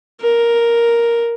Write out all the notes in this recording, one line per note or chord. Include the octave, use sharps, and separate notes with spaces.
A#4